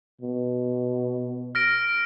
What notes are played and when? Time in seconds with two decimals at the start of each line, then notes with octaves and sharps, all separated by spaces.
0.21 B2
1.55 F6 A#6 D7